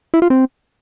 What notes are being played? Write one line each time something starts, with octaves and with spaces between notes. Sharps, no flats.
E4
F4
C4